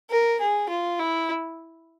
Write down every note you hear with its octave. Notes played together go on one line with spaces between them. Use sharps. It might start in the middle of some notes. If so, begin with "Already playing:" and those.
A#4
G#4
F4
E4